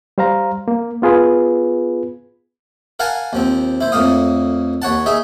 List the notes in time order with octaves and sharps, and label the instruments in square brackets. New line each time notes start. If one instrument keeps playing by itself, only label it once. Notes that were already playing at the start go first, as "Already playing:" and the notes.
[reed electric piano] G3 C5 F5 A#5
A#3
B3 F4 G#4 B4
[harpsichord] A#4 F5 F#5 G#5 A5
D#2 F3 C4
E4 C5
F2 A2 A#3 F5 D#6
D#2 C#5 F#5 A5
D#4 G#4 E5